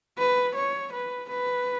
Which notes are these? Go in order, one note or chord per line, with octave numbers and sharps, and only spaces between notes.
B4
C#5
B4
B4